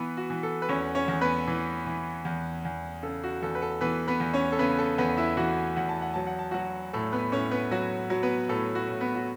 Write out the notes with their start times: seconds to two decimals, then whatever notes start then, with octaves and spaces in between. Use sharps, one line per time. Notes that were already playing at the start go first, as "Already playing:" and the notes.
Already playing: E3 B3 B4
0.17 F#4
0.30 E3
0.43 A4
0.62 B4
0.69 E2 C#4 C#5
0.95 C#4 C#5
1.08 E2
1.21 B3 B4
1.48 E3
1.86 E3
2.25 E2
2.65 E2
3.03 C#3 A4
3.23 F#4
3.42 E2 A4
3.55 B4
3.62 A4
3.81 E3 B3 B4
4.08 B3 B4
4.20 E2
4.34 C#4 C#5
4.52 A4
4.59 C#3 B3 B4
4.78 A4
4.98 E2 B3 B4
5.17 E4 E5
5.37 E3 F#4 F#5
5.77 E2 F#5
5.89 A5
6.02 F#5
6.14 F#3 A5
6.27 F#5
6.39 A5
6.51 F#3 F#4 F#5
6.93 A2 A4
7.13 B3 B4
7.32 A2 C#4 C#5
7.51 B3 B4
7.71 F#3 F#4
8.10 F#3
8.23 B3 B4
8.49 A2 A4
8.75 F#4
8.89 A2
9.01 B3 B4
9.15 F#4